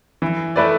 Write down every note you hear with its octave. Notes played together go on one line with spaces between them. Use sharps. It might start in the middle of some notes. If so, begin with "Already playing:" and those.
E3
A3 E4 B4 D5